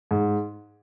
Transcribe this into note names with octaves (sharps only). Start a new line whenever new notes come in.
G#2